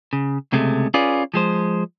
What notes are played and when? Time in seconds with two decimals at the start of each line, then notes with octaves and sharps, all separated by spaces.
0.13 C#3
0.52 C#2 C3 G#3 A3
0.94 C#4 F4 G#4 B4 D5
1.34 F3 G#3 C5